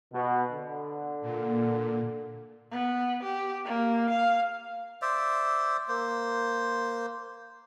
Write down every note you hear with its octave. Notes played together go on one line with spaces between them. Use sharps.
B2
D3
A#2
B3
G4
A#3
F5
C5 D5 E5
A#3 C5